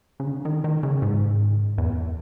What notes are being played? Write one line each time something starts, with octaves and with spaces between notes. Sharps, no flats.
C#3
D3
D#3
D#3
C#3
G#2
E2